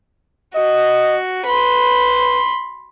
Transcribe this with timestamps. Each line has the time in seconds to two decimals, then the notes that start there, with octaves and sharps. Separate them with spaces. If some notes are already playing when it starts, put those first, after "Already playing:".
0.55 F#4 D#5
1.46 B4 B5 C6